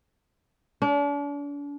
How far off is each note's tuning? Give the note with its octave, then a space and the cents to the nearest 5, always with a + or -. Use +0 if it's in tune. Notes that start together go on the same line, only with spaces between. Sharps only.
D4 -40